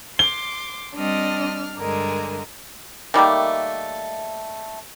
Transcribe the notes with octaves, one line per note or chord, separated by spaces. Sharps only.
C6 D6 G7
G3 C4 D4 D#5 F6
G2 D3 G#3 A#4
D#3 G3 A3 A#3